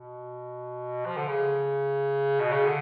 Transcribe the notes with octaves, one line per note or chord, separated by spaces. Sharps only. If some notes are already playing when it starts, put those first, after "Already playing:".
Already playing: B2
F3
D3
C#3
B2
C#3
D3